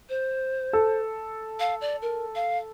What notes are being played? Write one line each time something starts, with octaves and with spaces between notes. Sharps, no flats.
C5
A4
F5
D5
A#4
F5